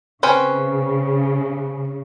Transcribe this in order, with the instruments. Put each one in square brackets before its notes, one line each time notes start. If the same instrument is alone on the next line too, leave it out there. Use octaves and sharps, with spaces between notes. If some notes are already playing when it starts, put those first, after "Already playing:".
[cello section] C#3 [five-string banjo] C4 C#4 B4